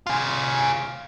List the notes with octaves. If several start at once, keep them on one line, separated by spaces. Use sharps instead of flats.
F4 G#4